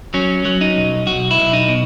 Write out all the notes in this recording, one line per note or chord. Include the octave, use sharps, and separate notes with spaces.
F#3 C#4
F#3
D#4
B1
B1 F#4
E4
B1
D#4
B2